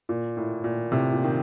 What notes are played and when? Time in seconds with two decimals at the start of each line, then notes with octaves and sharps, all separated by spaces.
0.09 A#2
0.37 A2
0.64 A#2
0.92 A2 C3
1.13 A#2
1.24 D#3